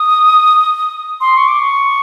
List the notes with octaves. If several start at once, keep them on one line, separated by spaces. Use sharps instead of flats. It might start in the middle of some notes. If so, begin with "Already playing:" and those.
Already playing: D#6
C6
C#6
D6
C#6